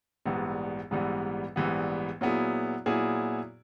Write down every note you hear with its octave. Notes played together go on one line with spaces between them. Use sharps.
A#1 G#2 E3 G3 B3
A#1 G#2 E3 G3 B3
A#1 G#2 E3 G3 B3
A#2 F#3 B3 E4 G#4
A#2 F#3 B3 E4 G#4